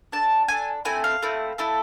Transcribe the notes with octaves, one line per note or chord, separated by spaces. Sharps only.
D4 A4 A5
D4 A4 G#5
A3 C4 E4 G#5
F5
A3 C4 E4
A3 E4 A4